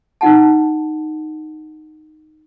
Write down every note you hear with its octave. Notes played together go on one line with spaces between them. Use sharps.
D#4 F4 F#5 A5